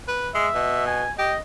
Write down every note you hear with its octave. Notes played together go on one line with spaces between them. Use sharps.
B4
G#3 E5
B2
G#5
G4 D#5